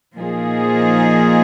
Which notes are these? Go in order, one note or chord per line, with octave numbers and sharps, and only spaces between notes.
A#2 F3 A#3 D#4 G#4